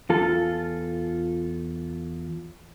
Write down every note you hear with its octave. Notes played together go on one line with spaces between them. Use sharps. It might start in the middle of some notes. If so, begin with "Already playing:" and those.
E2 F4 A4